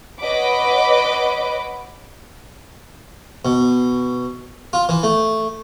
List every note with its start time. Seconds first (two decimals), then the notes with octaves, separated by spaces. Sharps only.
0.21 B4 C#5 D#5 F#5 B5 D6
3.45 B2
4.73 F4
4.89 E3
5.03 A3